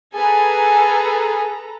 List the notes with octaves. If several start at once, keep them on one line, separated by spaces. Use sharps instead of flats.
G#4 A4 B4 G#5 A#5